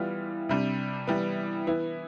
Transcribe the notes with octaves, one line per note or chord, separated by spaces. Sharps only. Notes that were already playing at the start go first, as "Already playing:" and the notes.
Already playing: E3 G3 B3 F4
C3 G3 D4
E3 G3 B3
E3 B3 E4